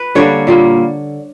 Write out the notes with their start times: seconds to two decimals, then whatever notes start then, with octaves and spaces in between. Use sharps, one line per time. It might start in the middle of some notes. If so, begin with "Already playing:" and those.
Already playing: B4
0.15 D3 G3 A#3 C#5
0.47 A#2 G3 A#3